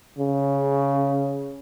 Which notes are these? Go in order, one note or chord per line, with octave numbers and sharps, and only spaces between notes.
C#3